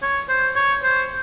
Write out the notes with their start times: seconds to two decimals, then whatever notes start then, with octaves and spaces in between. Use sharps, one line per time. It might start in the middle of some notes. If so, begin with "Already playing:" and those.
0.02 C#5
0.29 C5
0.56 C#5
0.83 C5